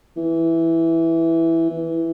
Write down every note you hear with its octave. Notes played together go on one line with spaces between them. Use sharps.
E3
E3